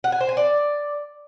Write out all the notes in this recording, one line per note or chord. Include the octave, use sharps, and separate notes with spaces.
F#5
G#5
C5
G#5
D5